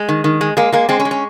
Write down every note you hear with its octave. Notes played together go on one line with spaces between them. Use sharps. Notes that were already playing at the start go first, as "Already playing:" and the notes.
Already playing: G#3
D#3
D#3
G#3
G#3 A#3
G#3 A#3
G#3 C4
C#4
G#3
C#4